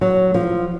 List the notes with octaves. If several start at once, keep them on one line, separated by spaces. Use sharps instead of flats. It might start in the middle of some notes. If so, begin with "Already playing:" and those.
F#3
F3